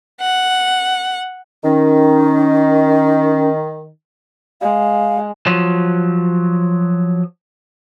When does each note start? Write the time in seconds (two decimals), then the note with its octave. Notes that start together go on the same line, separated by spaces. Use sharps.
0.21 F#5
1.64 D#3 C#4
4.61 G#3 F5
5.46 F3 F#3